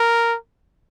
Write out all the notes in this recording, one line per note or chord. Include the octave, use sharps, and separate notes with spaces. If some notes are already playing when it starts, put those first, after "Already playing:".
Already playing: A#4